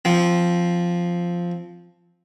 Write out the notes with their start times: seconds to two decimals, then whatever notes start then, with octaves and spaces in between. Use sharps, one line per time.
0.05 F3 C4